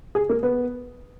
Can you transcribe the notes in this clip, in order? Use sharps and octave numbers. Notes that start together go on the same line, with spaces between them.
G#4
A#3
B3